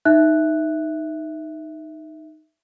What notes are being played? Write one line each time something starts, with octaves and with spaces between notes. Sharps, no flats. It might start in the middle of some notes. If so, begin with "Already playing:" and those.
D#4 E5 F#6